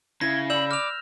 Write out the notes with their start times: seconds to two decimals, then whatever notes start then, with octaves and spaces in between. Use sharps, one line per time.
0.21 C#3 E4 G#6 A#6
0.50 D5 B5 E6 G6 E7 F#7
0.71 D6 F6 F7